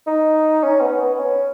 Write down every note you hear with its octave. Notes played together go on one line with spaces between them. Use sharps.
D#4
C#4
B3
B3
C#4